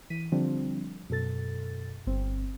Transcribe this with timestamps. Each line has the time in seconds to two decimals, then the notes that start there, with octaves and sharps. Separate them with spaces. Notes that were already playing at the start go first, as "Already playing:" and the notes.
0.10 E3 B6 D#7
0.32 D3 F3 G3 C4 D4
1.09 F#2 B2 A4 A6
2.07 G1 C4